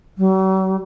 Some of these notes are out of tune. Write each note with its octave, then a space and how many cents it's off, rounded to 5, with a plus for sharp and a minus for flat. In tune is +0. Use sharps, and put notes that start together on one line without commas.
F#3 +45